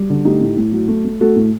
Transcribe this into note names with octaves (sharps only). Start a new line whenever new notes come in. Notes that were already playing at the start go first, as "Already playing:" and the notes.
Already playing: G3
D3
A3 D#4 G4
A2
A2
F#3
A3
A3
A3 F#4 A4
A2